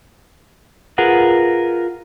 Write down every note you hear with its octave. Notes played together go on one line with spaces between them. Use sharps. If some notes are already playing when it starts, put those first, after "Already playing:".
F4 G#4 A#4 B4 F#5